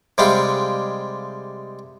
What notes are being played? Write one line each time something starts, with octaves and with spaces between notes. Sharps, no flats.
C3 G3 G#3 F5 G5